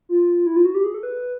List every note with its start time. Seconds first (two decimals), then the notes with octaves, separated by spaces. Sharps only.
0.09 F4
0.46 E4
0.56 F4
0.65 F#4
0.75 G4
0.84 G#4
0.94 A4
1.03 B4